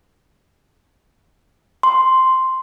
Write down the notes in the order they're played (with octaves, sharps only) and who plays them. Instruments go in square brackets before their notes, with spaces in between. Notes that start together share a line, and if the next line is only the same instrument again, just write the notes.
[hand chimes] C6